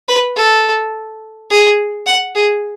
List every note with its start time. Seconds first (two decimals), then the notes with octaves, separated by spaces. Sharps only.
0.08 B4
0.36 A4
1.50 G#4
2.06 F#5
2.35 G#4